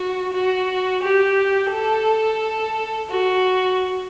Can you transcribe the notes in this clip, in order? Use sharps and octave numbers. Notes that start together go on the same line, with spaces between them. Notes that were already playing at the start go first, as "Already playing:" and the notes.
Already playing: F#4
F#4
G4
A4
F#4